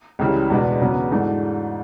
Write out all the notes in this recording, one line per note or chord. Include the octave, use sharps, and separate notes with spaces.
C#2 C#3 E3 G3
E2 B2 G#3 B3 D4
E2 C#3 F#3 B3
G#2 E3 A3 D4 F#4